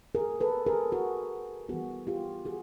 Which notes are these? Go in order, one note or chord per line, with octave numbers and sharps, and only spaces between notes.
G#4 A#4
A4 B4
G#4 A#4
F#4 G#4
E3 G3 B3 F#4 G#4
F4 G4
F#4 G#4